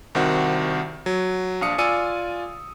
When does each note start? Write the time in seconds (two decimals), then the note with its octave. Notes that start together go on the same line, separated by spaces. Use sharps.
0.15 C2 D#3 C4 F#4
1.06 F#3
1.61 A#1 D4 F5 D#6 C#7
1.78 F4 D5 G#5 E6 C#7 D#7